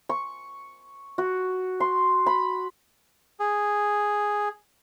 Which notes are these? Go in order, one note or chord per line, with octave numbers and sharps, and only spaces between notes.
C#6
F#4
C6
B5
G#4